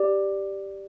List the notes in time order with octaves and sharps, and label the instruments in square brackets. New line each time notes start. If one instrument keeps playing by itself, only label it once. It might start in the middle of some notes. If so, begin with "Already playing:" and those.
Already playing: [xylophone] G4 D5